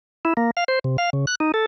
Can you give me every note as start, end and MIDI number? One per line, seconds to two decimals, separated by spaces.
0.25 0.33 64
0.37 0.51 58
0.57 0.64 77
0.68 0.79 72
0.84 0.97 48
0.98 1.10 77
1.13 1.25 49
1.27 1.35 90
1.40 1.52 63
1.54 1.66 69